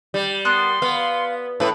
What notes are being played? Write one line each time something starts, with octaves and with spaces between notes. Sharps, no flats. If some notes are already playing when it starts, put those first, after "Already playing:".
G3
B3 A#4 C6 F#6
B3 F5
A2 A4 B4